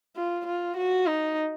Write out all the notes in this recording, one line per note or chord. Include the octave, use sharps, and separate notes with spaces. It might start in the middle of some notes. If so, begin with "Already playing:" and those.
F4
F4
F#4
D#4